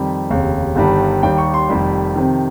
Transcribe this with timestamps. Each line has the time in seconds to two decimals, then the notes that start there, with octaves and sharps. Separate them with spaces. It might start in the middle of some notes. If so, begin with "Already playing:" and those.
Already playing: F2 D#3 G3
0.30 F1 D#2 C#3
0.76 G1 G2 D#3 G3
1.23 D#2 D#3 G3 G5
1.38 C#6
1.54 C6
1.69 F1 F2 D#3 G3
2.16 F2 C3 D#3